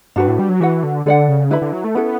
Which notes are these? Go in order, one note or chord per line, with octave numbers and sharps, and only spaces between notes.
G2 D4 F#4 B4
A2
G3
F#3
E3 F#4 B4 F#5
D3
D3 A4 D5 F#5
C#3
D3 E4 B4 E5 B5
D3
F#3
A3
B3 C#4 E4 A4